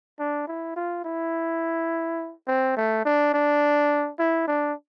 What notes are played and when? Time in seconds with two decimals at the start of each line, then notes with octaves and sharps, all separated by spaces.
0.19 D4
0.47 E4
0.76 F4
1.05 E4
2.47 C4
2.77 A3
3.05 D4
3.34 D4
4.19 E4
4.47 D4